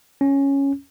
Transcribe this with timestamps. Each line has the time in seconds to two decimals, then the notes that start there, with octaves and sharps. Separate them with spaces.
0.21 C#4